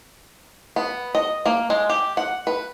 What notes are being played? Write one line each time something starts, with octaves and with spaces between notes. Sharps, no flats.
B3
D#5
A#3
G#3
G4
F#5
B4